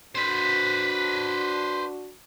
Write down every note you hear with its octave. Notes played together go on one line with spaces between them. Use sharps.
D4 F#4 B4 C5